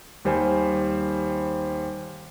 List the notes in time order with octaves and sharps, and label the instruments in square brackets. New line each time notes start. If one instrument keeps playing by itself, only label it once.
[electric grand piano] D#2 G3 C5 G#5